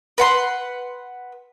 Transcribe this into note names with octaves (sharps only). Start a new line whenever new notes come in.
B4 F#5 C6